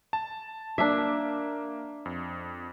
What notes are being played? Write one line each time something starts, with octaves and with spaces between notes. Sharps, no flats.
A5
A#3 D4 E5
F2